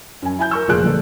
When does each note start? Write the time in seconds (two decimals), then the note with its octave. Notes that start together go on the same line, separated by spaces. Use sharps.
0.22 F#2 G#5
0.39 E4 G#5 G6
0.51 A#4 C#6 E6
0.68 F1 A#2 F4 G#4 F#6 D7
0.83 G1 A#2 A3 A4